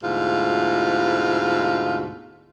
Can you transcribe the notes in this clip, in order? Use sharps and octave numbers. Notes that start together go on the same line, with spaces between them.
D2 G#2 B2 E4 F4